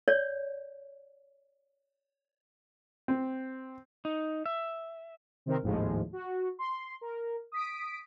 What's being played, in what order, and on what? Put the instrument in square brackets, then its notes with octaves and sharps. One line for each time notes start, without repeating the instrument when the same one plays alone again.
[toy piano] C#5 D5
[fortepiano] C4
[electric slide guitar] D#4
E5
[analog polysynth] C3 D#3 C4 A#4
G#1 D#2 A2 F3 G#3
F#4
C6
A#4
D#6 B6 D7